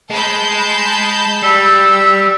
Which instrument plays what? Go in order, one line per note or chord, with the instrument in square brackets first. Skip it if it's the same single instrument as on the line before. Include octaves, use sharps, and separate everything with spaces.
[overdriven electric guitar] G#3 [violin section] A5 B5 G6
[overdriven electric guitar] G3 [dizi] E6